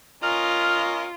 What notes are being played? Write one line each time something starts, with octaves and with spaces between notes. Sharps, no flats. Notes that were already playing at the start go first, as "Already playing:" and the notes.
C#4 F4 A#4 D#5 F6